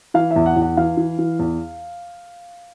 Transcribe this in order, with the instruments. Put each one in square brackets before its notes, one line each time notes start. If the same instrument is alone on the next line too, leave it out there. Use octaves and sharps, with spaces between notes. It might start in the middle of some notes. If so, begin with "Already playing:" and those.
[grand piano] E3 F5
E5
E2
F#5
E2
F#5
E3 F5
E3
E3
E2